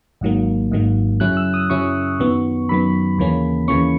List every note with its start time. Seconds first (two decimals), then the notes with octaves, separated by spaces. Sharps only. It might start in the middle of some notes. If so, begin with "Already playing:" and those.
0.21 G#1 G#2 D#3 F#3 A#3
0.71 G#1 G#2 D#3 F#3 A#3
1.20 F#2 C#3 F#3 C#4 E4 F#6
1.37 E6
1.54 D#6
1.70 F#2 C#3 F#3 C#4 E4 C#6
2.20 F#2 D#3 F#3 B3
2.69 F#2 D#3 F#3 B3 B5
3.18 D#2 C#3 E3 A#3 C#4
3.68 D#2 C#3 E3 A#3 C#4 C#6